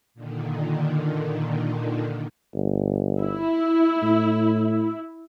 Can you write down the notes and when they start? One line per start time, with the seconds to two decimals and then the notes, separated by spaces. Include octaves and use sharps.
0.14 A#2 D3 D#3
2.55 G1
3.20 E4
4.02 A2